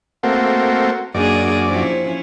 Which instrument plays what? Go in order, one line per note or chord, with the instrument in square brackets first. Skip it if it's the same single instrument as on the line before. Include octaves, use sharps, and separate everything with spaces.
[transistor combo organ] A3 A#3 C4 [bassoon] F#4
[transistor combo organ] F#2 D5 [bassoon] D#3 [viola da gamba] A#3 D4 G#4
[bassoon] C3 [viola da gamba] F3 C#4 E4